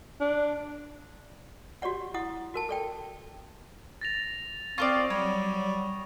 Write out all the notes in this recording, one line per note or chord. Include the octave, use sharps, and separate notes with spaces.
D4
F#4 G4 C#5 D5 F#5
E4 F#5 D#6
F#4 A#4 A5
A4 D5 G5
A6 A#6 F7
C4 F4 A4 D5 C#6 D#6
F#3 G3 C#5